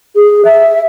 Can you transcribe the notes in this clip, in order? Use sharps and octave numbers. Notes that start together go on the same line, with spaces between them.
G#4
E5